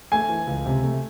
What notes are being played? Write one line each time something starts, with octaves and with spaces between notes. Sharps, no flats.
A3 G#5
E3
C#2
C3
A3